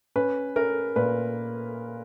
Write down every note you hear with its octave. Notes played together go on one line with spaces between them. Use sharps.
C#4 B4
C#4 A#4
A#2 B4